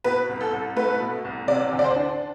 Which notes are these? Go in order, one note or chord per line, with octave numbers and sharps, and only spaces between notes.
B2 B4
C2
A4
C2
A3 B4
B2
C2
C3 D5
D2
D5
C5
D4